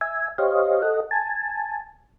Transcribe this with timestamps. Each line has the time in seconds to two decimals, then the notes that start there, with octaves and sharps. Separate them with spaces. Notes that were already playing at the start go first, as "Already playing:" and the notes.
0.01 E5 G#5
0.38 G4 C5 C#5 D#5 F5
0.82 A4 D#5 F#5
1.11 G#5 A5